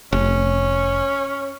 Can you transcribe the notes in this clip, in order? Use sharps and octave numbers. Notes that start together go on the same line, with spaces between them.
F1 C#4